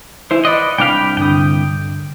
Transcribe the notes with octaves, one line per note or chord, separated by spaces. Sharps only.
E3 E4 C5
B4 D5 D#5 F#5
C2 D4 F5 G5 B5
G2 D3 G5 D#6